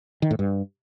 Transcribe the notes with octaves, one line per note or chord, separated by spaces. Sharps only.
D#3
A2
G2